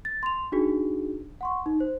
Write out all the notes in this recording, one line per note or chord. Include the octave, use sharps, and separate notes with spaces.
A6
C6 F7
D4 D#4 F#4 G#4
F#5 C6 C#6
D#4
C5